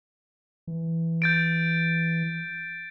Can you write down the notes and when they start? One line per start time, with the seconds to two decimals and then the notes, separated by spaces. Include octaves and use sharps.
0.67 E3
1.22 G6 A6 D7